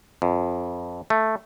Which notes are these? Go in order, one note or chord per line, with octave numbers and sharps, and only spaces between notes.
F2
A3